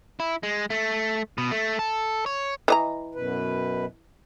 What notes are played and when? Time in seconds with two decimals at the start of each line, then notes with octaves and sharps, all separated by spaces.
0.20 E4
0.43 G#3
0.70 A3
1.38 B2
1.51 A3
1.79 A4
2.26 C#5
2.68 E3 D#5 A#5
3.15 F#2 B2 B4